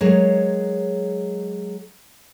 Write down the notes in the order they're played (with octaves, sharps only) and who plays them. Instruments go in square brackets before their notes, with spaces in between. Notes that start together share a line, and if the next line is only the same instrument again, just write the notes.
[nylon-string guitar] F#3 G#3 G#4 A#4 C#5